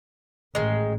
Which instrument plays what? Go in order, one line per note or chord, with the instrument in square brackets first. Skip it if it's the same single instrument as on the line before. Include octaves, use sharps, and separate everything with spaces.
[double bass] A1 [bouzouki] D#3 G#3